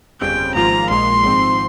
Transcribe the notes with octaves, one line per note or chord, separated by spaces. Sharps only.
G1 F2 C#3 G3 C4 G5
G#1 G#2 F3 A#3 F4 A#5
A#1 A#2 G#3 C6
G#1 G#2 F3 C4